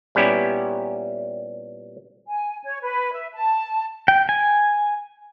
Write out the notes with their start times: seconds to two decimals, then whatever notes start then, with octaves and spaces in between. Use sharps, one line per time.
0.15 A#2 G3 B3 C#4 E4 G4
2.26 G#5
2.64 C#5
2.82 B4
3.12 E5
3.33 A5
4.08 G5
4.29 G#5